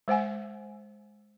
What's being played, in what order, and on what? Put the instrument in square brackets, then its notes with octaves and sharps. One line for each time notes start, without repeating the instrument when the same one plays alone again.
[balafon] G#3 C5 F#5 G#5